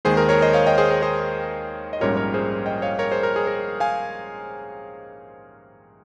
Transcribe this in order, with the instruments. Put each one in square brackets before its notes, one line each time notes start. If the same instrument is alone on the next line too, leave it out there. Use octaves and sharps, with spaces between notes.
[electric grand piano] D#2 D#3 G#3 G#4 C5
A#4
A#4 C#5
C5 D#5
C#5 F5
D#5 G5
G#4 C5
A#4
G#4 C5
D#5
A#1 G#2 G3 C#4 F4 A#4 C#5
A#4 C#5
G#4 C5
D#5 G5
C#5 F5
A#4 C#5
G#4 C5
A#4
G#4
A#4
F5 G#5